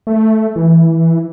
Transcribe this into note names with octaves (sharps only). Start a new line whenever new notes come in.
A3
E3